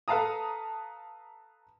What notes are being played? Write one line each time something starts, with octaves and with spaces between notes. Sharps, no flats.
A4 B4 F5 A5 A#5 D#6